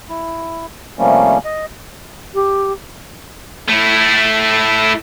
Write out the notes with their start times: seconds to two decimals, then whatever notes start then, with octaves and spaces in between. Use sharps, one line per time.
0.09 E4
0.99 C3 F3 G3 A3 A#3 C#4
1.45 D#5
2.35 G4
3.69 A3 E4